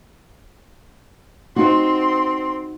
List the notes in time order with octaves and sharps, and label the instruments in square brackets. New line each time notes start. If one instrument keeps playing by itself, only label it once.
[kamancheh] C4 C6 [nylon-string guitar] D#4 F#4